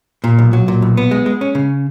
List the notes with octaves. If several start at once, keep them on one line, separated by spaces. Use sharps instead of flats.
A#2
B1
F#3
A#2
B1
B3
G#3
G#3
C#4
C#3